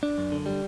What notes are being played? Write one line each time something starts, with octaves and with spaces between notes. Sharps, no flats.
D4
F#2
D3
G3